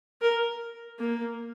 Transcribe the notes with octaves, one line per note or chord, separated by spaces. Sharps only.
A#4
A#3